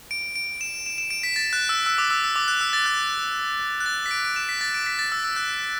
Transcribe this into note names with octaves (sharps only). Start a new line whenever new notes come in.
D7
D7
E7
E7
E7
D7
B6
A6
F#6
E6
E6
D6
E6
E6
D6
F#6
E6
A6
F#6
F#6
A6
B6
D7
D7
E7
B6
A6
D7
B6
A6
E6
E6
F#6